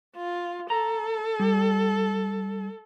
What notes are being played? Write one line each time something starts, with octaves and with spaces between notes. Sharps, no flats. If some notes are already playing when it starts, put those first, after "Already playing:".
F4
A4 A#5
G3